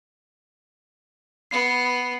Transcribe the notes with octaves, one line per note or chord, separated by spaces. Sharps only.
B3 C7 C#7